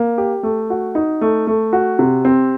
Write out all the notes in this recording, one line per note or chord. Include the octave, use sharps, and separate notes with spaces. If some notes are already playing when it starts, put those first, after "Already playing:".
Already playing: A#3
G4
A3
F#4
D#4
A3
A3
F#4
C3
C4